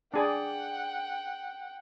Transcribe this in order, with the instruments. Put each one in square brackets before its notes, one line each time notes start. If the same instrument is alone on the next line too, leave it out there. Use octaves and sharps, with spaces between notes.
[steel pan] D4 G#4 D5 [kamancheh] F#5 G5